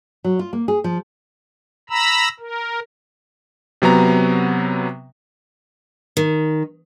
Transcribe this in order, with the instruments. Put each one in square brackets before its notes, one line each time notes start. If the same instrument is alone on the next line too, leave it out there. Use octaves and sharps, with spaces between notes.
[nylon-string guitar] F#3
F4
A#3
G#4
F3
[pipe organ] A#5 B5 E6
A#4
[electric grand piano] C3 F#3 B3 A#5
[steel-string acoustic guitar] D#3